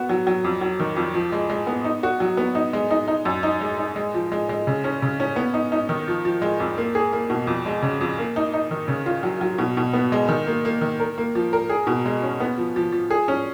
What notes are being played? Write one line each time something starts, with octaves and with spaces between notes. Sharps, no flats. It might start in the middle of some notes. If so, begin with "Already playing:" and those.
Already playing: B3 F#4
F#3
F#3
F2
F#3
D#3
F2
F3
G#3
G#3
B3
D#4
F#4
F#3
B3
D#4
G#3
D#4
D#4
F#2
D#4
G#3
D#4
G#3
F3
G#3
G#3
C#3
C#4
C#3
C#4
B3
D#4
D#4
D#3
F3
F3
G#3
F2
A#3
G#4
A#3
B2
F2
G#3
C#3
F2
A#3
D#4
D#4
D#3
C#3
F4
F#3
F#3
B2
B2
B3
G#3
D#3
A#3
A#3
D#3
A#4
A#3
F3
A#4
G#4
B2
G#3
C#4
B3
F3
F3
F3
G#4
C#4